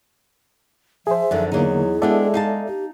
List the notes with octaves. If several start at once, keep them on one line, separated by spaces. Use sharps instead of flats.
F3 G#4 C5 E5
F#2 D3 D#3 F3
E2 D3 F#3 A#3 D#4 G#4
G#3 B3 D4 G4 A4 D5 E5
D#4 F5 A5
G4